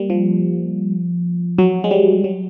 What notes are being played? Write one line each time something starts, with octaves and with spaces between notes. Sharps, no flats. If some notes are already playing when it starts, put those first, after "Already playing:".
Already playing: G3 A#3
F3
F#3
G#3
G3
F#3